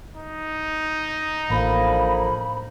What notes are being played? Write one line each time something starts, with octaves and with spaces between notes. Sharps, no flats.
D#4
A1 D3 F3 A#3 B5